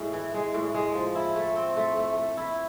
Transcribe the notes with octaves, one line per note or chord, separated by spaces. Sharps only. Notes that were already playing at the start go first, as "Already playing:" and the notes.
Already playing: A2 G#3
E3
G#3
A2
G#3
F3
E4
A3
C4
A3
A3
A3
E4